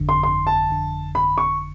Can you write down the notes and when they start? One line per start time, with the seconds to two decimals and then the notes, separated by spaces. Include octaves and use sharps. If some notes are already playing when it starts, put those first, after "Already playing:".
Already playing: G1 F2 D3
0.09 C6
0.23 G1 F2 D3 C6
0.47 A5
0.69 G1 F2 D3
1.15 G1 F2 D3 B5
1.38 C#6